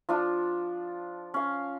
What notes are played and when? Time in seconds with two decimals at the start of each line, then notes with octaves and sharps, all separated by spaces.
0.09 F3 D4 F4
1.34 C#4 F5